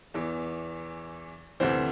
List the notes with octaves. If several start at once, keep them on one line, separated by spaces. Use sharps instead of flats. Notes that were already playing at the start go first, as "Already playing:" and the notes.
E2 E3
D2 C3 E3 C5